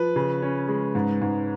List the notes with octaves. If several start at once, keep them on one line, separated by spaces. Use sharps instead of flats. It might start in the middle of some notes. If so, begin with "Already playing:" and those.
Already playing: F3 B4
C#3
C#4
G#3
G#2
G#2